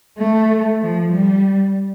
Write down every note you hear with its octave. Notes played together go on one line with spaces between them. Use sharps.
A3
F3
G3